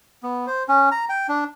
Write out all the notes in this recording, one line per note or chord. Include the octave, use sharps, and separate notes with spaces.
B3
C5
C#4
A#5
G5
D4